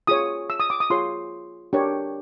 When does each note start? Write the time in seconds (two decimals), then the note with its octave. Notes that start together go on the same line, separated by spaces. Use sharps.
0.07 F4 G#4 C#5 D#6
0.50 E6
0.60 D#6
0.70 D6
0.80 D#6
0.90 F4 G#4 C#5 C6
1.73 D4 G4 A#4 C#5